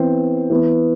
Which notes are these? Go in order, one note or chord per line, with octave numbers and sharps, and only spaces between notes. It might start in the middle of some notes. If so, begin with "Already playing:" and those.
Already playing: E3 B3 C4 C5
E3 B3